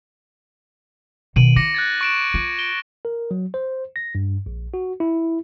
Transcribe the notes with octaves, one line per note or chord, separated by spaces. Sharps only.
B2 D#3 D7 D#7 F#7
E4 D6 A#6 C#7
F#6 G#6 A6
C#6 D7 E7
F4
D7 G7
A#4
F#3
C5
A#6
G2
A#1
F#4
E4